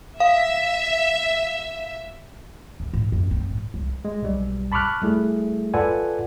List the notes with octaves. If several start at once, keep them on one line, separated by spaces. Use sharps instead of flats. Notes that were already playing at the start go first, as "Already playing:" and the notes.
E5 F5
D#2
G#2
F#2
C4
G#2
C2
G#3
B1 G3
A5 B5 C#6 D6 F6 F#6
G3 A3 E4 G#4
F4 A4 B4 D5 F#5 G#5